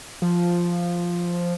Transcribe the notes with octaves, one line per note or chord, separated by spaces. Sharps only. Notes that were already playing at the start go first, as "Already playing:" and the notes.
F3